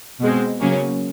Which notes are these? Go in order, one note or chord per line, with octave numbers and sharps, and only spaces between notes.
B2 G#3 C4
C#3 F#3 A#3 C#4